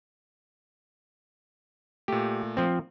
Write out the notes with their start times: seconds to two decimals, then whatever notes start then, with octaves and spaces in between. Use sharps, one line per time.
2.08 A#2 A3 G4
2.57 F3 C4